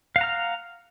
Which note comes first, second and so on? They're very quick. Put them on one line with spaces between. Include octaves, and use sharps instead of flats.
F5 F#5 A#5 F6